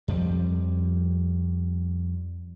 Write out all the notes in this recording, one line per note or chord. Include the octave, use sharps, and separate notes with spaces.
F2 F3 G3